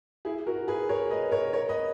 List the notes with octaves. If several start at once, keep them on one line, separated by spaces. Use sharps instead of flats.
E4 G#4
F#4 A#4
G#4 B4
A#4 C#5
B4 D#5
A#4 C#5
A#4 C#5
B4 D#5